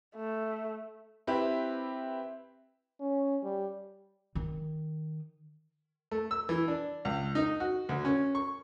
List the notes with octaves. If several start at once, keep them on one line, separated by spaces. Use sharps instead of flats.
A3
C4 E4 G4 B4
C#4
G3
D#3
A3
E6
E3
D4
C#2
D#4
F#4
D2
C#4
C#6